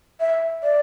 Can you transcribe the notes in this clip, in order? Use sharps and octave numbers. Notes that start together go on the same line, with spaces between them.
E5
D5